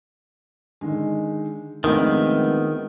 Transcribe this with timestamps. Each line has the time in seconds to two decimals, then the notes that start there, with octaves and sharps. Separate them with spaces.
0.81 D3 D#3 G#3
1.84 D#3 F3 G#3 A3 B3 C4 D4